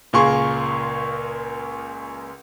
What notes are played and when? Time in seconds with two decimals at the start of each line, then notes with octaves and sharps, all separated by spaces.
0.13 C#2 A#2 A#3 G#4 C6 C#6